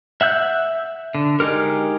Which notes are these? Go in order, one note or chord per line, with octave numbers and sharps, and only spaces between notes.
E5 F#5 E6 G6
D3
G#3 D#4 G4 A#4